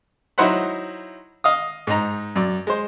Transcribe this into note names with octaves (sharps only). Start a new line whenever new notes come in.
F#3 D#4 E4 C5 F#5 B5
D#5 F5 D#6
G#2 D#4 A#5
F#2 D5
G#3 C5